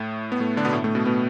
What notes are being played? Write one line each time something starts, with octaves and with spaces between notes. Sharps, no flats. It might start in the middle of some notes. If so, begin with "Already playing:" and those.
Already playing: A2 A3
B3
A2 A3
D3 D4
B2 B3
A2 A3
A2 A3
B2 B3
B2 B3